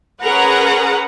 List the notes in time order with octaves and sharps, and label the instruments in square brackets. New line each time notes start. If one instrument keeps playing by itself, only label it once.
[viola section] C#4 G#4 A#4 B4 F#5 A#5